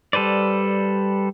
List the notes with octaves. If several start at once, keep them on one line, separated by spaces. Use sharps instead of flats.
G3 A4 B4 C5 D5